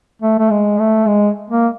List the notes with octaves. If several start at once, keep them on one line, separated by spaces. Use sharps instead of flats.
A3
A3
G#3
A3
G#3
A#3